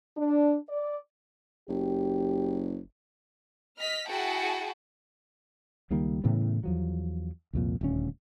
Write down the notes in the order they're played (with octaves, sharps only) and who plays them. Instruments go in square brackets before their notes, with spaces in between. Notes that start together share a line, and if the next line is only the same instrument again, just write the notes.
[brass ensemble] D4
D5
[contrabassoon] F#1 [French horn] G4
[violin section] D#5 F6 B6
E4 F#4 G#4 F#5 G5 A5
[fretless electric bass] C#2 D#3 G3 A#3
A2 C#3 E3 B3
E2 F3 F#3
C2 F2 A#2
D#1 D2 C#4